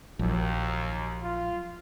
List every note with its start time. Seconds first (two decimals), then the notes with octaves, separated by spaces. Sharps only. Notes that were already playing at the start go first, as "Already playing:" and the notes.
0.19 A#1 D#2 F3 F#3
1.22 F4